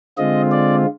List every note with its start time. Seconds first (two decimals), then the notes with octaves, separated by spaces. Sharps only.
0.18 D3 G#3 C4 F4 D#5
0.52 D5